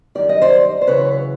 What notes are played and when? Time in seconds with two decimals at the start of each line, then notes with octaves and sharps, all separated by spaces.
0.15 F#2 D#3 G3 D5
0.29 D#5
0.42 C5 D5
0.81 C5
0.87 F#2 C#3 E3 B4 C#5